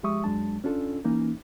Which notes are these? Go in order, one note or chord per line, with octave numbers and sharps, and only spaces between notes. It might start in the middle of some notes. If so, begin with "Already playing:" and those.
F3 G#3 G4 E5 C#6 D#6
F#2 F#3 G#3 D4 A5
C#4 D4 F4 A4
E3 A#3 C#4 D#4